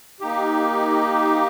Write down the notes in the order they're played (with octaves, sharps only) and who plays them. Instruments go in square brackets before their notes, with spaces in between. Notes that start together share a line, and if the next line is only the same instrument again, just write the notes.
[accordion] A#3 D#4 G4